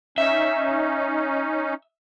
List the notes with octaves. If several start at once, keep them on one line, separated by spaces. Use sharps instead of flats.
C#4 D#4 E5